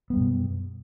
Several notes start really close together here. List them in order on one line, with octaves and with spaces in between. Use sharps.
B3 G3 F#2 B2